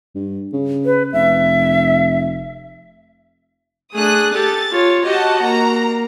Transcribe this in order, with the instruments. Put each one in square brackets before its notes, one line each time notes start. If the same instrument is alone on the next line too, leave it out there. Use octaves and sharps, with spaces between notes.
[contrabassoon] G2
C#3
[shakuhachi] B4
[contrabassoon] F1 [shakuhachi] E5
[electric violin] A3 [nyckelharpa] D4 G#4 [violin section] D#6 F#6
[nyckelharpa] G4 [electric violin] A4 [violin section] A6
[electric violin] F4 [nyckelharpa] C#5
[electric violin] F#4 [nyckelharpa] G4 [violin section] D#5 F#5 A5
[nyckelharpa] A#3 [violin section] A#5